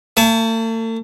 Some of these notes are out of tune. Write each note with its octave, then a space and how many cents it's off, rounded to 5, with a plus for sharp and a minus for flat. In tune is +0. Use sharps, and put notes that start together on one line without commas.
A3 +45 A5 -25